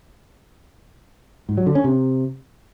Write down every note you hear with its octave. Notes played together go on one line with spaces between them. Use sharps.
G#2
F#3
D3
C#4
C3